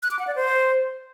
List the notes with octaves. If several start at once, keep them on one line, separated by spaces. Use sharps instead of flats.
F#6
D6
F#5
D5
C5